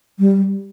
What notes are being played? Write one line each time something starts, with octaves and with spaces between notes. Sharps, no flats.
G3